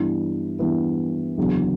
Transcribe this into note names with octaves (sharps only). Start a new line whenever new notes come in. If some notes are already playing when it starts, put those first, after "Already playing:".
Already playing: G2 E3 B3 E4
G2 E3 B3 E4
F#1 E2 D3 F#3